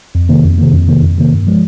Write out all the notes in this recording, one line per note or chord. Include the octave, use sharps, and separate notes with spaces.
F2
C3 D#3 A#3
F2
C3 D#3 A#3
F2
C3 D#3 A#3
F2
C3 D#3 A#3
G2
F3 G#3